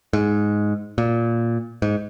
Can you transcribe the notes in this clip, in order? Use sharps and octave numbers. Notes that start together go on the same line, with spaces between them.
G#2
A#2
G#2